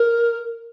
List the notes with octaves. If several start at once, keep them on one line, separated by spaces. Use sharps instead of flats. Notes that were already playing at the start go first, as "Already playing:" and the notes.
Already playing: A#4